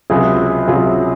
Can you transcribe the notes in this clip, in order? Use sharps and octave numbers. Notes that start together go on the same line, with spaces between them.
C#2 C3 F#3 F4 G#4
C#2 C3 F#3 F4 G#4